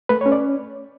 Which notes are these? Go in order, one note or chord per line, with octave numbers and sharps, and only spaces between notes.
A3 B4
C#5
C#4
D5